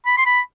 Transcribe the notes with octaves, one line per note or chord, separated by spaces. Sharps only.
B5
C6
B5